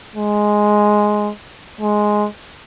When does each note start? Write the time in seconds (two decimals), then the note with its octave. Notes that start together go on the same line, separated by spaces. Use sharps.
0.16 G#3
1.81 G#3